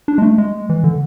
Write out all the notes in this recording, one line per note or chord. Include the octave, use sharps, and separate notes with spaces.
D4
G#3
A3
G#3
E3
D3